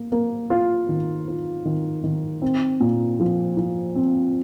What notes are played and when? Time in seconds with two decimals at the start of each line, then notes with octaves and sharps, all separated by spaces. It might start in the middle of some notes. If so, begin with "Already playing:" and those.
Already playing: A#3
0.12 A#3
0.50 F4
0.89 D#3
1.28 F4
1.65 D#3
2.04 D#3
2.42 C4
2.80 A#2
3.20 F3
3.57 F3
3.95 C4